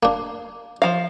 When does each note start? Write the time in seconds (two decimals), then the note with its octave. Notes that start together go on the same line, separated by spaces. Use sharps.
0.03 A#3 D4
0.82 F3 F5